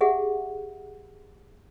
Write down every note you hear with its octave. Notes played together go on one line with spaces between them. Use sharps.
G4 G#4 E5 F#5